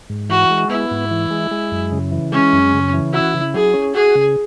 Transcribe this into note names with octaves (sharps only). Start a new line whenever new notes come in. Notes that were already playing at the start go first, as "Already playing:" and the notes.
G#2
E3 F#4
G#3
B3 E4
G#2
E3
G#3
G#3
F#2
C#3
E3
G#3 C#4
F#2
C#3
E3
E4 F#4
C#3
F#3 G#4
C#4
F#4 G#4
C#3